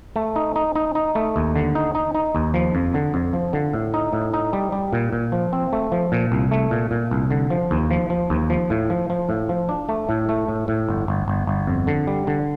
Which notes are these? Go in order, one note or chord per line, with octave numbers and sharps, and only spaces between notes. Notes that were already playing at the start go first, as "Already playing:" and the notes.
A3
D#4
D#4
D#4
D#4
A3
D#2
D3
D#4
D#4
D#4
D#2
F3
F2
D3
F2
F3
D3
A2
D#4
A2
D#4
G3
G3
A#2
A#2
F3
C4
A3
F3
A#2
C2
A3
A#2
A#2
C2
D3
F3
D#2
F3
F3
D#2
F3
A2
F3
F3
A2
F3
D4
A3
A2
A3
A2
A2
G1
G1
G1
G1
F2
D3
G3
D3